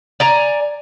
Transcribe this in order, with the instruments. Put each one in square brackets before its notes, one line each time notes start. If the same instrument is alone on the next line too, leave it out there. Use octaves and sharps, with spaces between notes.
[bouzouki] D5 G#5 A#5